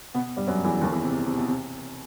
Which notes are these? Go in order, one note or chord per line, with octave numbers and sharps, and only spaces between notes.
B2 B3
G2 G3
F#2 F#3
E2 E3
D#2 D#3
E2 E3
C3
C3
C3
B2
C3